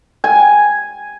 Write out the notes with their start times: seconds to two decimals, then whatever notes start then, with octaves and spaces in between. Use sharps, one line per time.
0.24 G#5